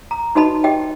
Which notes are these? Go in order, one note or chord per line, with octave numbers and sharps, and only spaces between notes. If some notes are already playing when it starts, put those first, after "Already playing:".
A#5
D#4 F#4 B4 D#5 A5 B5
G4 D#5 G5